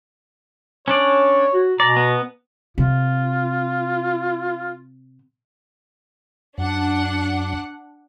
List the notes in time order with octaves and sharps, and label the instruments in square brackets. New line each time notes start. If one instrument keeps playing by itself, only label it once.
[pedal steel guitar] C#4 D4 D5 [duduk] C#5
[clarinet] F#4
[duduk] B2 [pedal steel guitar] D5 [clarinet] A#5
[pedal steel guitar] B3
[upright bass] C3 [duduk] F4
[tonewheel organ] F#2 [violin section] D4 F#5